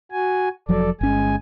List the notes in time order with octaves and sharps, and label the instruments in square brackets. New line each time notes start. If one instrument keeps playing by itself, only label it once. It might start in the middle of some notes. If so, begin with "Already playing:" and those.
[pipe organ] F#4 G#5
[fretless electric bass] F1 F3 F#3 [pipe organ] A4 D5
[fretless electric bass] G1 C#4 [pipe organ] G#3 G#5